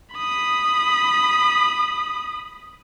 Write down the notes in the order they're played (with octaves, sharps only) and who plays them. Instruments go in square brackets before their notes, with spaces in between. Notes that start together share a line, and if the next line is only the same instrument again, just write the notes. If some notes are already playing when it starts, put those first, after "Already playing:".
[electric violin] B5 D#6